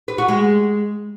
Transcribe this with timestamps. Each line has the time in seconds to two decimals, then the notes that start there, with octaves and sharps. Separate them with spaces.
0.08 B4
0.18 F#4
0.28 G#3